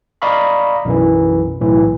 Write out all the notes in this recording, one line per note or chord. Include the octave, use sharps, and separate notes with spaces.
D5 D#5 F5 A#5 B5 C#6
B1 F#2 E3
B1 A2 E3